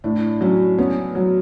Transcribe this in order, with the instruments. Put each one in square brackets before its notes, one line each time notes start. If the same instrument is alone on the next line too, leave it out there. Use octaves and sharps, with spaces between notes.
[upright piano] A2 [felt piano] D4
[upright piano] F#3 [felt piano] C#4
[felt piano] B3 [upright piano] C#4
[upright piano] F#3